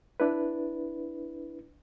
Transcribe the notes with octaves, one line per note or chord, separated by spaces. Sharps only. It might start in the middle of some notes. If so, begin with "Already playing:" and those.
D4 E4 B4